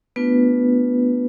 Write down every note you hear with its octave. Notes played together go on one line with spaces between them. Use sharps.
A3 B3 D4 F4 B4